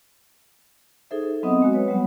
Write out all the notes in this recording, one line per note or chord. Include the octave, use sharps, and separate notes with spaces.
D#4 G#4 A4 C5 E5
E5
F#3 B3 C4 D#5 F#5 D#6
G#3 F#4
B4 C#5
F#3 G3 B3 F#5